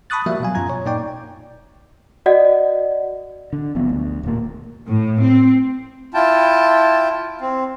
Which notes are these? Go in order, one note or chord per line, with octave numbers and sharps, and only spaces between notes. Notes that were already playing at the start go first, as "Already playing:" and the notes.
A5 B5 C#6 D#6 F#6 A6
F3 G3 A#3 F#4 E5
B2 F#3 F5 G#5
F#2 B2 F4 A#5 G#6
C#5
A#2 A#3 D#4 D5 G5 C#6
F#4 D5 D#5 F#5
D3
F#1 F3 B3
D2
D#1 A#2 A#3
A2
C4
E4 F4 G5 A5
C4